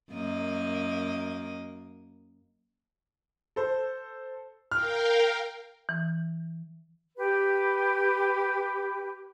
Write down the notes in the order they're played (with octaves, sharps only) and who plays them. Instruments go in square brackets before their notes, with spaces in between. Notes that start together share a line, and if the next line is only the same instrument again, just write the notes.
[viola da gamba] F#2 A#3 D#5
[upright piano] A4 C5
[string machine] A#4 F5 G5 [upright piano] F6
[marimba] E3
[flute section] G4 B4